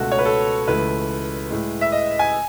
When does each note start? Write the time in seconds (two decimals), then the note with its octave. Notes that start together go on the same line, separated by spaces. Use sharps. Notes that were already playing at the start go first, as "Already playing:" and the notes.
Already playing: C#2 B2 A3 F#4
0.12 C#5
0.19 B4
0.25 A4
0.67 C#2 C#3 E3 A3 B4
1.50 A2 G#3
1.81 E5
1.92 D#5
2.19 G#5